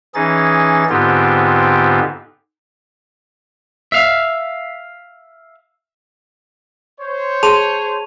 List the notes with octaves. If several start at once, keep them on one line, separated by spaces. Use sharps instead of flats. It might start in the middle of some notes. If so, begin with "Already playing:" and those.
E3 C#4 D#4 G#4 A6
G#2 D3 B3 C4 F4 G4
E5 F5
C5 C#5
G#4 A5 C6 D#7 F7